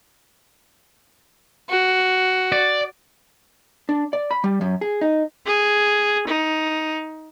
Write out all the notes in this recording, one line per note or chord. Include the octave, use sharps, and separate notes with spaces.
F#4
D5
D4
D5
B5
G3
F#2
G#4
D#4
G#4
D#4